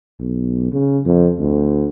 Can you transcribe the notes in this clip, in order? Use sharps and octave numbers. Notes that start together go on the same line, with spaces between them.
B1
C#3
F2
D2